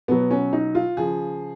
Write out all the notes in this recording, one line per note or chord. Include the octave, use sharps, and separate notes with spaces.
B2 F#3 B3
C#4
D#4
F4
C#3 F3 G#4